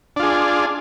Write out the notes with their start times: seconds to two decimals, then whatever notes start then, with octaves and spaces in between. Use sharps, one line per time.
0.16 D4
0.20 F4
0.23 G#4